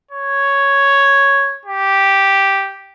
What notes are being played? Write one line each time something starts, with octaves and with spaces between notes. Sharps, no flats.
C#5
G4